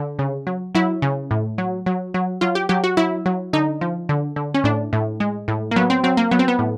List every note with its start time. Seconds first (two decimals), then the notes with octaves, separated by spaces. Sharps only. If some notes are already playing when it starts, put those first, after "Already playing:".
Already playing: D3
0.19 C#3
0.47 F#3
0.75 F#3 E4
1.02 C#3
1.31 A2
1.58 F#3
1.86 F#3
2.14 F#3
2.41 F#3 F4
2.55 G4
2.69 F#3 G4
2.84 F#4
2.97 F#3 E4
3.26 F#3
3.53 D3 D#4
3.81 F3
4.09 D3
4.36 D3
4.54 C#4
4.64 A2 D4
4.93 A2
5.20 G#3
5.48 A2
5.71 A#3
5.76 F#3 B3
5.90 C4
6.04 F#3 C4
6.17 A#3
6.31 F#3 B3
6.39 C4
6.48 B3
6.59 A2